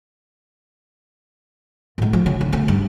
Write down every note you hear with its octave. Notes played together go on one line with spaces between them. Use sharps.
A2 G#3
F3
C#3
D3
D2 C#3
G2